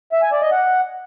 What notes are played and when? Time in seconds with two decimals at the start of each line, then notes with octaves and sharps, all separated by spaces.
0.13 E5
0.22 G#5
0.32 D5
0.42 D#5
0.52 F#5